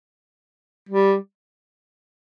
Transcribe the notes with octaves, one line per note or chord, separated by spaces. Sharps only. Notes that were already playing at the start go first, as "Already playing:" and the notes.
G3